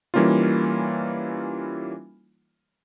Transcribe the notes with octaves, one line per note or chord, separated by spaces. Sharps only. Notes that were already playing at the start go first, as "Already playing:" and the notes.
E3 G3 A#3 C#4 D#4 F4